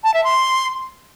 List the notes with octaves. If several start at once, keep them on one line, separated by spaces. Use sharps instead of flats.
A5
E5
C6